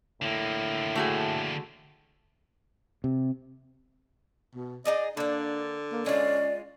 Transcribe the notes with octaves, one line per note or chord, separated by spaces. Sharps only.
A2 D3 A#3
A3 F#4 G#4
C3
B2
D#4 G#4 D5 D#5
D3 A#3 D4 D5
A#3
G#3 C#4 F4 D5